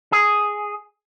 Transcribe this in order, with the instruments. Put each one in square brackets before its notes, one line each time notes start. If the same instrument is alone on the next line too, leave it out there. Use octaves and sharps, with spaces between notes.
[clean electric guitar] G#4